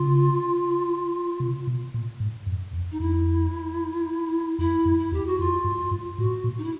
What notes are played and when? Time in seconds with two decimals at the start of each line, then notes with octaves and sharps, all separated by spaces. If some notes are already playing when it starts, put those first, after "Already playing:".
Already playing: C#3 F4
1.40 C3
1.67 B2
1.94 A#2
2.20 G#2
2.47 F#2
2.73 F2
2.91 D#4
3.00 F2 E4
4.58 F2 E4
4.85 F#2
4.98 E4
5.12 E2 G4
5.26 F#4
5.39 F2 F4
5.64 G2
5.91 G2
6.18 A2 F#4
6.44 A#2
6.57 D#4
6.63 E4